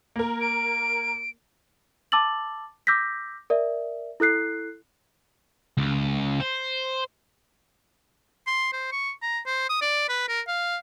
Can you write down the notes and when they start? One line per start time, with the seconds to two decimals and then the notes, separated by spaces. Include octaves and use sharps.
0.16 A#3 A#4
0.40 D7
2.12 A5 D6 E6 A6 F#7
2.87 D6 E6 G6 A#6 B6
3.50 A#4 D5 E5
4.20 E4 A4 F#6 C7
5.78 C#2
6.40 C5
8.47 C6
8.73 C5
8.92 C#6
9.22 A#5
9.46 C5
9.69 D#6
9.82 D5
10.09 B4
10.28 A#4
10.48 F5